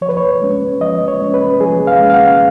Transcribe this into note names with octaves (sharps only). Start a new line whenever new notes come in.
F3 C#5
B4
C#5
G#3 C#4
F3 D#5
C#5
G#3 C#4
B4
F3 G#4
F5
G#3 C#4
F5
F#5